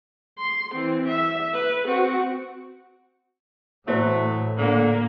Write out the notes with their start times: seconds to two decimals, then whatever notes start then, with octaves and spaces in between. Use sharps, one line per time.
0.38 C6
0.74 E3 C4
1.07 E5
1.54 B4
1.85 C4 F#4
3.88 A2 E3 F#3 A3 E4 F#4 C5
4.58 A#2 D3 A#3